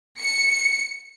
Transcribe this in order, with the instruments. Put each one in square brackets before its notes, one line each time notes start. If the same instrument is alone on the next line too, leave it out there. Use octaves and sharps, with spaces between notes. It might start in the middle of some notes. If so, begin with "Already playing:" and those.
[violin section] C#7